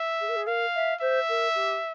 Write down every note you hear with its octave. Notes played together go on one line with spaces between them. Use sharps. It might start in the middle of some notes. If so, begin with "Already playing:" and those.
Already playing: E5
G#4
A#4
G#4
A#4 F5
E5
C5 E5
A#4
G4